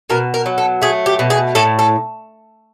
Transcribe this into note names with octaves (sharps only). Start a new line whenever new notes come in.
B2 A#4
A#4
F#3
A4
A3 G#4
G4
B2
G#4
A2 A4
A4